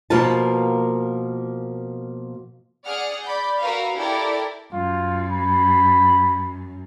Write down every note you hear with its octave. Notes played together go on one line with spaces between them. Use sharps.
B2 F3 A#3 A#4 B4 A5
G#4 D5 F#5 F6
D5 B5 G6
F#4 A#4 B4 E5 F5
E4 G4 A4 A#4 D5
F#2 F4
B5